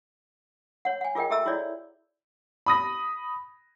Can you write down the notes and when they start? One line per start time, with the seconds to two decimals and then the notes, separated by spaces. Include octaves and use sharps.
0.85 C#5 F#5
1.01 F#5 G#5
1.15 F4 G#4 A#4 D#5 G5
1.30 G4 A4 E5 A#5 E6
1.46 E4 F#4 G#4 C#5 D5
2.66 B5 D#6 A#6